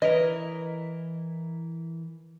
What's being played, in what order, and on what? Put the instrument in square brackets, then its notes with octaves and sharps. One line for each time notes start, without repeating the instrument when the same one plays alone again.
[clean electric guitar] E3 E4 A#4 [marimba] B4 [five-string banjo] D#5